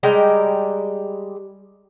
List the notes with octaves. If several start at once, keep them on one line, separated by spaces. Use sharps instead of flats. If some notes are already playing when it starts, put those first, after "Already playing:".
G3 G#3 G5 A#5